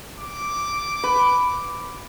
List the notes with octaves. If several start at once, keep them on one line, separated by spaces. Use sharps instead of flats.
D6
B4